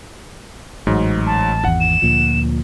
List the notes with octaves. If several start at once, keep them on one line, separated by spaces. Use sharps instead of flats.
A1 G#2 F#3
A5
G#1 E2 F#5
E7
D2 A#2 F3